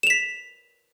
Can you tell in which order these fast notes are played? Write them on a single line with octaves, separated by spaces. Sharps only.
E7 F7 B6